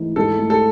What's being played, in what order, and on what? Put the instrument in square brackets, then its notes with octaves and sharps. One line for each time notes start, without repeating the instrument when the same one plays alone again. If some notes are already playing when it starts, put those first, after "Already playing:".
Already playing: [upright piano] G#2 E3 A3 D#4
[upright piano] G#2 [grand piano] A4
[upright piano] A3
[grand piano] A4